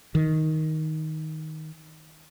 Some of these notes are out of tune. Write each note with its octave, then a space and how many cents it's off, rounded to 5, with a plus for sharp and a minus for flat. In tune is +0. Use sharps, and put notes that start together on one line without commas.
D#3 +10